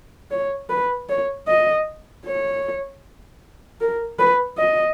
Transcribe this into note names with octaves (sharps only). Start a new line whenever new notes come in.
C#5
B4
C#5
D#5
C#5
A#4
B4
D#5